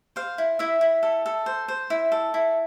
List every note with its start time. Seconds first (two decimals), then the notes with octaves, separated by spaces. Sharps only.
0.16 C5 F5
0.38 E4
0.59 E4 E5
0.81 E4
1.03 A4
1.26 A4
1.46 C5
1.68 C5
1.90 E4
2.12 A4
2.34 E4